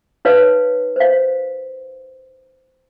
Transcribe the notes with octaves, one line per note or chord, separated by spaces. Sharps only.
D#4 B4 C#5 F5
C5 F5